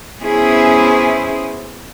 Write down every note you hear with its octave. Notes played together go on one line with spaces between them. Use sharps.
B3 C#4 E4 G#4 C5